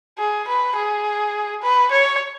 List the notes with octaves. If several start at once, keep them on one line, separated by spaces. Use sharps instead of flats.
G#4
B4
G#4
B4
C#5